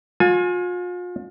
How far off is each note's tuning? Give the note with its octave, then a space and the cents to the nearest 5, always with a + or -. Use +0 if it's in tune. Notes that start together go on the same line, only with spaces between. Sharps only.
F4 +40 G#5 +10